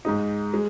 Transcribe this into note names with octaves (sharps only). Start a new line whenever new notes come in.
G#2 G#3 D#4
G#3